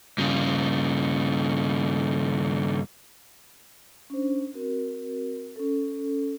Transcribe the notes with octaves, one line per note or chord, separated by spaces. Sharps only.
G2 C#3
C#4 D4 C5
C4 F#4 A#4
C#4 A4